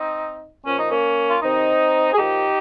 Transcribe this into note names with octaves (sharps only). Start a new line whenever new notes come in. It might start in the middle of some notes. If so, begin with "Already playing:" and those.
Already playing: C4 D#4
A#2 F3 C#4
D#4
A#3 C#4
F4
C3 D#3 C4 D#4
G#4
A#2 F3 D#4 G4